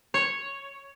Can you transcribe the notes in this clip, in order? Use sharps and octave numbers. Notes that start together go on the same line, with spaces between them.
C#5